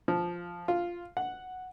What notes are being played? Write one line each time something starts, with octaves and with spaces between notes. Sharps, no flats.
F3
F4
F#5